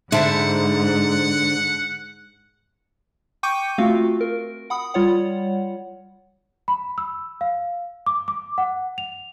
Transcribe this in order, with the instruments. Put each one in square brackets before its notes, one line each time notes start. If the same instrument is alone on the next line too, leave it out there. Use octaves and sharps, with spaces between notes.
[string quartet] G#2 [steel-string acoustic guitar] D3 C5 [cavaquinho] E5 A5 B5 [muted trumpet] F#5
[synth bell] G5 C#6 D6 G6 C#7 D#7
A3 C4 F4 F#4 F5
A#4
F#5 B5 D#6
G3 F4 C#5 F#5
[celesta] B5
E6
F5
D6
D6
F#5
F7